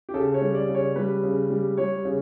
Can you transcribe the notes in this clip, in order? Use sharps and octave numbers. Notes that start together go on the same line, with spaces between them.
G4
C#3 A4
C#5
G3
D5
C#3
C#5
G3 B4
C#3
G3
G3 C#5
C#3